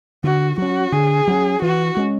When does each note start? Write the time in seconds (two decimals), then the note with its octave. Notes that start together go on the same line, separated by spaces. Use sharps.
0.24 D3 F#4
0.58 F#3 C#4 F#4
0.92 D3 G#4
1.28 F#3 C#4
1.62 E3 F#4
1.97 G#3 C#4